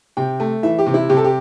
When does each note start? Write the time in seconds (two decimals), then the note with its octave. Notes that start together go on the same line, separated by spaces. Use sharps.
0.17 C3 G5
0.40 A3
0.63 E3 E5
0.79 G4
0.87 C3
0.94 E4
1.09 C3 G4
1.17 A4
1.24 G4